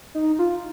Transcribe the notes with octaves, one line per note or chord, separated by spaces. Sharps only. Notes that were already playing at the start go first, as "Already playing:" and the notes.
D#4
F4